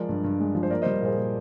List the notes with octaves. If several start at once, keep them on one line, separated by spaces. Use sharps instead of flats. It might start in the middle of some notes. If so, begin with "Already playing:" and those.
Already playing: F3 G#3 A#4 D5
G2
G2
G#3
F3
C5
A#3 A#4 D5
G3 C5 D#5
A#2 G#4 C5
A#2